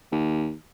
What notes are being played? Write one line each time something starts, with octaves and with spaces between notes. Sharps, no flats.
D#2